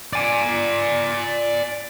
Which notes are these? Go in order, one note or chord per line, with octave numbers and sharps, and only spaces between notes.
D5 G#5